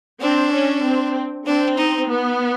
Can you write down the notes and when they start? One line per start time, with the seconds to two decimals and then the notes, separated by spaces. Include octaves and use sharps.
0.21 C4 D4
0.53 C#4
0.84 C4
1.46 C4 D4
1.77 D#4
2.09 B3